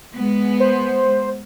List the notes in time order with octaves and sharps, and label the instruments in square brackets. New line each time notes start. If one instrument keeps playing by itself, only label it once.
[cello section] G#3 B3
[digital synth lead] C5